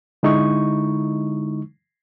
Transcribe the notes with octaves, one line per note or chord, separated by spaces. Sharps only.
D3 G#3 D#4 E4 C#6